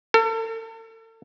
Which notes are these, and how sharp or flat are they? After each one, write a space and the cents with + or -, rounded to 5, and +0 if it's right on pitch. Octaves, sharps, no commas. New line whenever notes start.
A4 +40